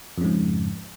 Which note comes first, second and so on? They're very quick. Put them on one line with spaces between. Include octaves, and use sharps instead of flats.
F2 C#3 G#2